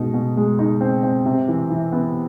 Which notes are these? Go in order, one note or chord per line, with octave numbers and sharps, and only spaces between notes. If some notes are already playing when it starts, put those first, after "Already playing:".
Already playing: B2 G#3 D#4
B2
G#3
D#4
C4
C4
C3
E3
E3
B3